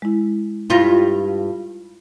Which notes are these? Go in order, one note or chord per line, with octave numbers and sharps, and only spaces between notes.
G#3 E4
G2 G3 E4 F4 F5 A#6